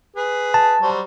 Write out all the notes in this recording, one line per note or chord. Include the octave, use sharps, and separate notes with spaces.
G#4 B4
A5
F#3 G3 C5